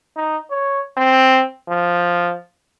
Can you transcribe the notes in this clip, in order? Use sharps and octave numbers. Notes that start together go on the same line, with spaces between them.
D#4
C#5
C4
F3